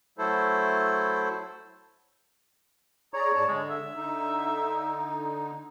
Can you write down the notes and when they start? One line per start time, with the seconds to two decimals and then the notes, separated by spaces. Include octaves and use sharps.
0.18 F#3 A3 E4 A4 C5
3.14 G#4 C#5 D5 A#5
3.36 G#2 D5 A5
3.49 D3 G#3
3.70 E5
3.96 D3 D#4